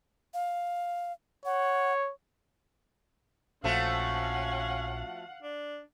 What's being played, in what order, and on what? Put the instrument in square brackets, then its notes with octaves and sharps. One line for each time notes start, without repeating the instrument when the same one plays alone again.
[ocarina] F5
[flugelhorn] C#5 [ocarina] F#5
[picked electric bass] A#1 [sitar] F3 A3 F#4 [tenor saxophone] C#4 [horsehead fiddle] F5 F#5
[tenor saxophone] D4